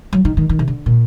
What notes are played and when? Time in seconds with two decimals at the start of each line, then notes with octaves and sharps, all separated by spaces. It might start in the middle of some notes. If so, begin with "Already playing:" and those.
0.13 F#3
0.25 D#3
0.37 D#3
0.49 D#3
0.59 C3
0.68 D3
0.86 A#2